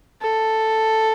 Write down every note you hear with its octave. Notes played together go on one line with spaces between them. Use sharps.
A4